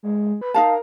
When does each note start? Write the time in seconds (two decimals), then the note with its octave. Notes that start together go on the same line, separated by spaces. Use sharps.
0.03 G#3
0.41 B4
0.54 D#4 A#4 F5 A5